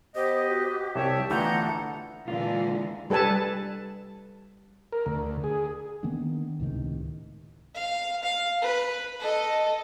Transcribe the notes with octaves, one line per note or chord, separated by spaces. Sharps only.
B3 G4 C5 D#5
F#4
C2 C#5 E5 G5 A5
D3 E3 A3 B3 F4 F#5 A#5 G6
A5
A#2 D3 E3 G#3 F4
G3 A4 B4 G#5 A5
A#4
D2
G#4
D#3 A#3 B3 D4
C#2 A2 C3 D#3
F5
F5
B4
A4 D#5